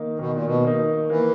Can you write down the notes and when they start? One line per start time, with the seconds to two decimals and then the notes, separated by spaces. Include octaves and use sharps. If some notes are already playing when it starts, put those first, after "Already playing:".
Already playing: D#3 A#3 D#4
0.19 B2 D#3
0.32 A#2
0.45 B2
0.65 A#3 D#4
1.10 E3 A#3